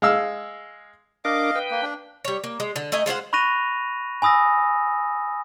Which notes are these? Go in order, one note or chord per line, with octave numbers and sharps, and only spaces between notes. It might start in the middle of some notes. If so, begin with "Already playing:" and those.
G#3 F5 E6
D4 A#4 D#5 F5 D6
B4 G5
A#3
D4
G3 C#5
A#3
G#3
D3
A3 D#4 D#5 G#5
G#3 F4 C5 F#5
B5 C#6 F#6 A#6 D#7 F7
G#5 B5 D#6 E6 A#6